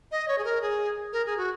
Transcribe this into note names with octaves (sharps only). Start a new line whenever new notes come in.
D#5
C#5
G#4
A#4
G#4
A#4
G#4
F#4